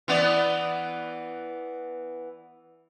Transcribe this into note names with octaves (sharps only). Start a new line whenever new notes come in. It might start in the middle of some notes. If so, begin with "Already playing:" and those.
E3 B3 D5